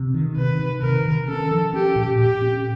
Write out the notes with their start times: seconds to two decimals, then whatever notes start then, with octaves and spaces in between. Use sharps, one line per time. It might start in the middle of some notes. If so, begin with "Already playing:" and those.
Already playing: C3
0.14 D#3
0.37 C3 B4
0.59 D#3
0.82 C3 A#4
1.05 D#3
1.28 C#4 A4
1.51 F3
1.73 C#4 G4
1.96 A#2
2.19 A#2 G4
2.42 C#4